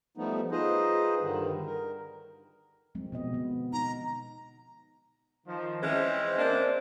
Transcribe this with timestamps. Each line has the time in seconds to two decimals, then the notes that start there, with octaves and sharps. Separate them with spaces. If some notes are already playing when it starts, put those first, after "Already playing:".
0.17 F3 G3 A3 B3 D#4
0.51 D#4 F4 G#4 B4 C5 D#5
1.20 G2 D3 D#3 G3
1.66 A#4
2.95 F3 G#3 C4
3.12 B2 B3 D#5
3.32 D3 B3
3.73 D#4 A#5
5.47 D#3 F3
5.82 E3 G#3 C4 C#4 C5 E5
6.39 A#3 D4